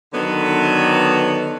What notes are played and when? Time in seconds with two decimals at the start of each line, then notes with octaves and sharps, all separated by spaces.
0.14 D3 D#3 F#3 B3